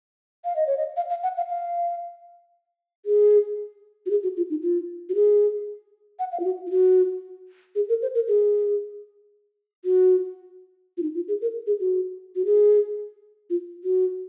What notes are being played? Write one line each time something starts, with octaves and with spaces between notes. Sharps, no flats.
F5
D#5
C#5
D#5
F5
F5
F#5
F5
F5
G#4
F#4
G#4
F#4
F4
D#4
F4
F#4
G#4
F#5
F5
F4
F#4
F4
F#4
G#4
A#4
C5
A#4
G#4
F#4
F4
D#4
F4
G#4
A#4
G#4
F#4
F#4
G#4
F4
F#4